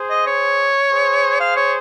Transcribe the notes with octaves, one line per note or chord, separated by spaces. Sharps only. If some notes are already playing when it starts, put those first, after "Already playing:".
Already playing: G#4 C5
D#5
C#5
G#4 C5
F5
C#5